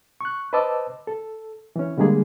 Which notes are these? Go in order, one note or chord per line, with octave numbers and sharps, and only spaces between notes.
C#6 F#6
B4 C5 D#5 A5 D6 E6
A4
E3 C#4
D3 G3 G#3 A#3 G#4